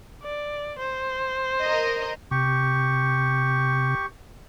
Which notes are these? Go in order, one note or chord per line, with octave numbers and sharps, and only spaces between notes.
D5
C5
A#4 D#5
C3 G4 C#6